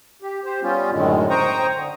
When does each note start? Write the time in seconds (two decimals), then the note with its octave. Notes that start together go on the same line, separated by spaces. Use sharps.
0.22 G4
0.45 G4 C5
0.62 G3 B3 C#4 F4
0.91 F#2 A2 D3 D#3 G#3
1.30 C5 G5 A#5 C#6 D#6
1.73 D3